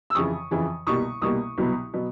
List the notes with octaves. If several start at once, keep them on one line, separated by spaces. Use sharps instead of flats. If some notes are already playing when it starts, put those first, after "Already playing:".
E6
F2 C#3 E3 C#6 D#6
F2 C#3 E3
C2 B2 G3 A#3 C#6 D#6
C2 B2 G3 A#3 C#6 D#6
C2 B2 F#3 B3
B2 F#3 B3